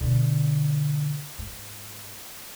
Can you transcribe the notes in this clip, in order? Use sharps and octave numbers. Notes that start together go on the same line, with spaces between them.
B2 D3
G#2